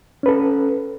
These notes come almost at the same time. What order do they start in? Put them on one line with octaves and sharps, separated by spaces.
C#4 B4 A4